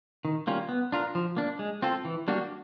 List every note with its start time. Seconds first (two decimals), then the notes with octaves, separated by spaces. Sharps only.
0.25 D#3
0.47 G3 A#3 C#4 F4
0.69 B3
0.92 D4 F4 A#4
1.15 F3
1.37 A#3 D4
1.59 G#3
1.82 C4 F4 A4
2.05 E3
2.28 G3 A#3 D4 F#4